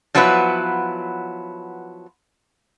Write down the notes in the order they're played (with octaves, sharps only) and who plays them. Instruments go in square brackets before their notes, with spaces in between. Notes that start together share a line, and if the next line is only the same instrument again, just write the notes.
[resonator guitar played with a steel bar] F3 F#3 B3 E4 B4